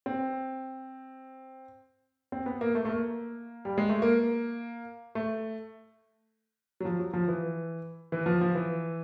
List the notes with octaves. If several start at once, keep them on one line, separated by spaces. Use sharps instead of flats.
C4
C4
B3
A#3
A3
A3
A#3
G3
G#3
A3
A#3
A3
F#3
F3
F#3
F3
E3
E3
F3
F3
E3